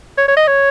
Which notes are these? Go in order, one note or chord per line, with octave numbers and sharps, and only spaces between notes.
C#5
C#5
D#5
C#5